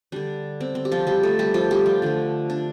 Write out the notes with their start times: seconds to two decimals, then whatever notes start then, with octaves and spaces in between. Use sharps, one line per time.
0.12 D3 G3 D4
0.60 C4
0.75 C4
0.85 G4
0.92 F3 F4
1.07 G3 G4
1.23 A3 A4
1.39 G3 G4
1.54 F3 F4
1.71 G3 G4
1.86 F3 F4
2.02 D3 F3 A3
2.50 D4